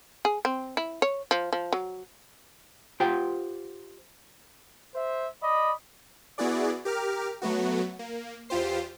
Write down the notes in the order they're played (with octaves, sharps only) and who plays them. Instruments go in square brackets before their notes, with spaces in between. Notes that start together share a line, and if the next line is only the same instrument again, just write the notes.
[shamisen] G#4
C4
E4
C#5
F3
F3
F#3
[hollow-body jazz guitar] F4 G4 C5 F#5 G5
[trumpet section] C5 E5
[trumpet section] D5 B5 [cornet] D#5
[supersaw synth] B3 E4 F#4 G#4 D5
G4 A#4 D6 F6
F#3 A3 B3 F#4
A#3
E2 F4 G4 C5 C7